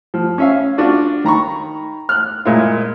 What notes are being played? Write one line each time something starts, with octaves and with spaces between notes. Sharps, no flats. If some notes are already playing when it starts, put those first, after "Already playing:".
F3
C#4 E5 F5
D4 F4 F#4 D5
D#3 A#5 B5 C#6
F6 F#6
A#2 G#3 E4 F4